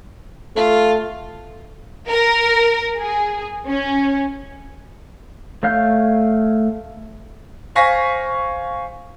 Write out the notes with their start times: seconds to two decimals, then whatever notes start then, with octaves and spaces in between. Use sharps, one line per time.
0.56 A3 F4
2.08 A#4
2.96 G#4
3.67 C#4
5.63 A3 C#5 F5 G6
7.75 C5 F5 G#5 C#6 A#6 B6